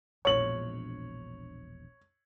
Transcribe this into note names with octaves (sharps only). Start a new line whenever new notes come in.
E1 A#1 C#5 F#7